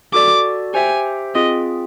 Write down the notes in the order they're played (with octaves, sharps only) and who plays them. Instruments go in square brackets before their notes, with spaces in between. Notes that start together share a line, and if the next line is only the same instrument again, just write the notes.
[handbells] F#4 A4 D5 [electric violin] D6
[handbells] G4 C5 E5 G5 [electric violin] G#5
[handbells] C4 F4 G#4 [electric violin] D#5